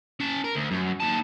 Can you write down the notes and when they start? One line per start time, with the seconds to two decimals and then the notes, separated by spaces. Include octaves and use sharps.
0.20 C#4 A5
0.44 A#4
0.55 D2
0.71 F#2
1.00 D#2 A5